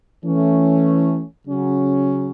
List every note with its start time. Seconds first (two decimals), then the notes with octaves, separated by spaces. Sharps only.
0.24 E3 A3 C#4
1.47 C#3 F#3 C#4